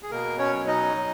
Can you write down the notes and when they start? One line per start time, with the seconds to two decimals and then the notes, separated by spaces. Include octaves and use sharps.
0.03 G#4
0.11 B2 A#3 A#4
0.39 C#4 C#5
0.54 F#3
0.67 D#4 D#5
0.95 F#3